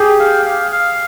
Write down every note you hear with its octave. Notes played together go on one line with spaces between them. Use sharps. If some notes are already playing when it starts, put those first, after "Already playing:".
Already playing: G4 G#4
F5
F5
F5